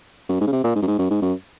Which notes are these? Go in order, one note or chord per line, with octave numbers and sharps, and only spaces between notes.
F#2
G#2
C#3
C3
A#2
G#2
F#2
G#2
F#2
G#2
F#2